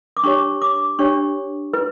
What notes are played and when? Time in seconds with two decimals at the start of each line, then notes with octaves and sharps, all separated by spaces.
0.17 D6
0.24 D4 G4 C#5 C#6
0.62 D6
0.99 D4 G4 C#5 C#6
1.73 E4 B4